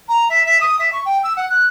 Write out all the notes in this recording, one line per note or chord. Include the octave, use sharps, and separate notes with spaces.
A#5
E5
E5
D#6
E5
C#6
G5
E6
F#5
F#6